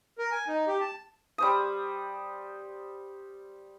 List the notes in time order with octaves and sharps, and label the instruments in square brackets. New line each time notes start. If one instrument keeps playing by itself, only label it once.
[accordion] A#4
G#5
D#4
G4
A5
[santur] G3 C5 D#6